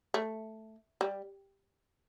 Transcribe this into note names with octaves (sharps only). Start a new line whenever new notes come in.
A3
G3